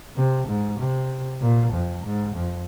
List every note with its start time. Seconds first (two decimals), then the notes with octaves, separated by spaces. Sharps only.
0.16 C3
0.47 G#2
0.79 C3
1.41 A#2
1.72 F2
2.04 G#2
2.35 F2